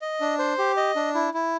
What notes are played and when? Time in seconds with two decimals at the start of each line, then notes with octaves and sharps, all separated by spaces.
0.02 D#5
0.21 D4
0.39 C5
0.58 G4
0.77 D#5
0.96 D4
1.15 E4
1.34 E4